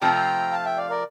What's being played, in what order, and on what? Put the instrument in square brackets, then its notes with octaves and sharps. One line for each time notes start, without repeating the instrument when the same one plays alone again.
[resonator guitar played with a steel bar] C3 F3 A3 C4 F4 [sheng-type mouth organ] G5 A#5
[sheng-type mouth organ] F5 A5
E5 G5
D5 F5
A#4 D5